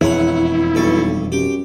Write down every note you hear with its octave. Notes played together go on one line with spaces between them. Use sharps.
E1 F2 E3 E4 G#4 C#5 F#5
B1 G2 A4 C#6
F#2 G4